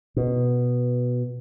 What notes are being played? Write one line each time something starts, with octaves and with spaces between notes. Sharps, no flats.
B2